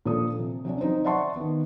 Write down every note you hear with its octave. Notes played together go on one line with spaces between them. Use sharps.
A#2 F3 D4 A4 D#6
C3
C3 F#3 C#4 D4
F#3 C4 D#4 C5
D5 E5 F#5 A5 C6 C#6
D#3 B3